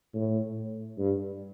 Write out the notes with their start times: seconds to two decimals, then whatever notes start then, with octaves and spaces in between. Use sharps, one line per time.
0.14 A2
0.98 G2